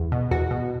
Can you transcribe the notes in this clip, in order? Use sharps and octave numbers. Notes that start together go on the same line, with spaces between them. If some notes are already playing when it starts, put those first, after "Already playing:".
Already playing: E2
B2
E2 F#4
B2